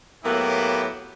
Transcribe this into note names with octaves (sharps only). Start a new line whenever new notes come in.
A2 F#3 A#3 B3 E4 G4